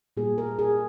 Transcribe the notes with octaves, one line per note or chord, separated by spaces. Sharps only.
A#2 G3 A#3 G#4
A#4
G#4